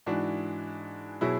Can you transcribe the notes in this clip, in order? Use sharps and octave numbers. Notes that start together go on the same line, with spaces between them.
G#2 E3 D4 F#4
B2 F#3 E4 G#4